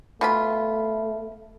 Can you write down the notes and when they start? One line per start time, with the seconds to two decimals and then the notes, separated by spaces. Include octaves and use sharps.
0.21 B2 A3 F4 B5